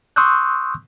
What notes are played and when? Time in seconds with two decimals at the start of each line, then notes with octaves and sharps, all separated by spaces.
0.16 C6 C#6 D#6 E6 F#6 G6